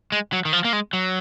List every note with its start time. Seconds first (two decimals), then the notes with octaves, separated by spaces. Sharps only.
0.12 G#3
0.33 F#3
0.45 D#3
0.53 F3
0.64 A#3
0.73 G#3
0.93 F#3